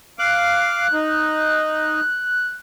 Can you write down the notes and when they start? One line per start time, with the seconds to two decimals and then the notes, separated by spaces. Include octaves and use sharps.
0.19 F5 D6 F#6
0.93 D#4